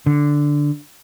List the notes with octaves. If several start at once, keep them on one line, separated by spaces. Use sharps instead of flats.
D3